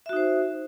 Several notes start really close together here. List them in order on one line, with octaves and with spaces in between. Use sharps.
E5 F#4 D#4 C5